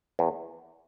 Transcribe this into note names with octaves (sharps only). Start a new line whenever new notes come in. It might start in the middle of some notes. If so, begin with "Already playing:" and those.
E2